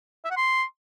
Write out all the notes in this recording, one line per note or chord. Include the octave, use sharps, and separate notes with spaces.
E5
F#5
C6